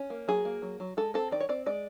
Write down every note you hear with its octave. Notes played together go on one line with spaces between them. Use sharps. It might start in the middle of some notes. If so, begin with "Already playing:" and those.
Already playing: C#4
A#3
F#3 G#4
A#3
F#3
F#3
G#3 A4
C4 A4
D#3 D5
C#5
C4 D5
G#3 D5